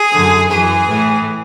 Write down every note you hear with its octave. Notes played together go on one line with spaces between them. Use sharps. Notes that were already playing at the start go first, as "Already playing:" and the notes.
Already playing: G#4
F#2 D3
F#2 E3 G#4
A2 E3